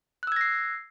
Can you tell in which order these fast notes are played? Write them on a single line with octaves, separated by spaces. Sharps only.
F#6 E6 G#6 A#6 C7